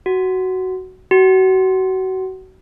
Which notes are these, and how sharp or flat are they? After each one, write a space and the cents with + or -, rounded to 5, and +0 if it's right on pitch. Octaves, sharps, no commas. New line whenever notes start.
F#4 +10
F#4 +30